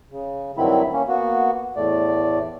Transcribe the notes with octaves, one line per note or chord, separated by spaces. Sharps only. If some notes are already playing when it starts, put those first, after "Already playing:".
C#3
G2 D#3 F#3 C4 E4 B5
A#3 C#4
A#3 B3 F#4
E2 A2 A3 D5